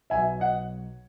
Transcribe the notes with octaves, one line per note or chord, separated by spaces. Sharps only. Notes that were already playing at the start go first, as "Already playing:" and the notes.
B1 B2 F#3 E5 G#5
D#5 F#5